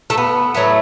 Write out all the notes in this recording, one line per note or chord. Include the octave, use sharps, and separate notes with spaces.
A3
B3
A2 F#3 A3 B3